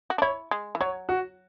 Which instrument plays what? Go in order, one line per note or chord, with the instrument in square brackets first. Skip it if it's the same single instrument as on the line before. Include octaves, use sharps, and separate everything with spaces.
[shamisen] F#4
D4
[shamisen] E4 [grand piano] C#5
[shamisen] G#3
E3
[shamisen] F#3 [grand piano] C#5
[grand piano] F#4